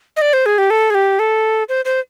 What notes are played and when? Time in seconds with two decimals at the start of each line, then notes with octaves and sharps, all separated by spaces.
0.17 D#5
0.22 D5
0.33 C5
0.46 G#4
0.58 G4
0.70 A4
0.90 G#4
0.95 G4
1.19 A4
1.69 C5
1.85 C5